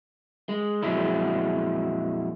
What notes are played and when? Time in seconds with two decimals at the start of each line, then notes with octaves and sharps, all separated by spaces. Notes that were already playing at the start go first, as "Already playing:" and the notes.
0.49 G#3
0.82 F2 A#2 F#3 G#3 E4